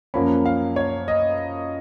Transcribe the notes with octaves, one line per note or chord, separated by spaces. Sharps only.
F#2 F3 A#3 C#4 B5
F5
C#5
D#5